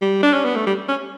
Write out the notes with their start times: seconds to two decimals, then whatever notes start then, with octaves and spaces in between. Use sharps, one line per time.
0.02 G3
0.23 D4
0.33 C#4
0.45 B3
0.55 A3
0.66 G3
0.88 C#4